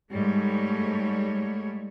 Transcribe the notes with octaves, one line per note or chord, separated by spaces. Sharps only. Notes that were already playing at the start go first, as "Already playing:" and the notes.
G#2 G3 A3 C#5